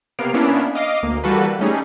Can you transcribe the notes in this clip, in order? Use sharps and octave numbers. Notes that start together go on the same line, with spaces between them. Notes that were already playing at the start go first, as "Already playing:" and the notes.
C3 A#3 B3 F6 C7 D7
A#3 B3 C#4 D4 E4
D#5 F5 D6 C7
D2 A#3
E3 G3 A#3 F#4 A4 B4
G3 A3 C#4 D#4 G#4